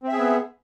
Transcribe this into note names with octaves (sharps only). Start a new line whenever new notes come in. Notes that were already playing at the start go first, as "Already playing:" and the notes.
B3 C4 G#4 E5